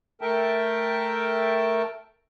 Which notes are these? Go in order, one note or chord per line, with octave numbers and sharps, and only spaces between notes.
A3 A4 A#4 E5 G5 A5